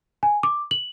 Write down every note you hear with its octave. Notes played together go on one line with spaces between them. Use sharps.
G#5
D6
F#7